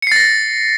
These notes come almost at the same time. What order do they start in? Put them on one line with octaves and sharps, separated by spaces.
C#7 C7 A6 A#6